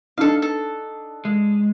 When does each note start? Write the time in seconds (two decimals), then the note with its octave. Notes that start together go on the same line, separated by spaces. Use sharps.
0.18 D4 D#4 A4 F5
0.42 A4
1.25 G#3